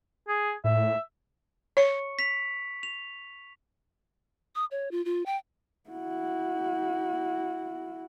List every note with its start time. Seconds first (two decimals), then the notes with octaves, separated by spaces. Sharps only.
0.28 G#4
0.64 A2 E5
1.77 C#5 C#6 C#7
2.19 B6 F7
2.83 F7
4.55 D#6
4.71 C#5
4.91 F4
5.05 F4
5.26 G5
5.90 E4 F#4